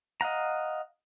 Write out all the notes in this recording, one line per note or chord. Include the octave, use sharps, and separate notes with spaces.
D#5 F5 F#5 A#5